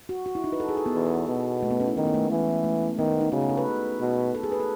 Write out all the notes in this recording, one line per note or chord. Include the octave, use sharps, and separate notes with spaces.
F#4
F#4
E4
D#4
B4
A4
G#4
A4
B3
E2
B2
A3
B3
C#4
E4
D#3 C#4
B3
A3
G#3
E3
A3
B3
D#3 B3
D#4
C#3 F#4
G#4
A4
B4
B2
A4
G#4
B4
A4